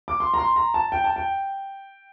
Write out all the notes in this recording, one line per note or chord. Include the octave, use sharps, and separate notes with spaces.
D6
C6
A#5
C6
A#5
A5
G5
A5
G5